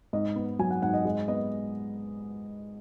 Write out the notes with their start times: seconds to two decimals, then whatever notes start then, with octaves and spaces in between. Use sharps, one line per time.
0.13 G#2 D#5
0.36 B3
0.59 F#3 G#5
0.71 F#5
0.82 G#2 F#5
0.93 D#5
1.05 G#3 D#5
1.28 B3 D#5